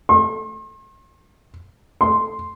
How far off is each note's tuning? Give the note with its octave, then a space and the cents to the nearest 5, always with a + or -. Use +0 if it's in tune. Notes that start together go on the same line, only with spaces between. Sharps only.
C6 +45
C6 +0